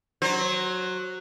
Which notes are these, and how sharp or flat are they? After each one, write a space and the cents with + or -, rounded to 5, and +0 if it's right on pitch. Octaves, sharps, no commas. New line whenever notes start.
F#3 +0 C5 +25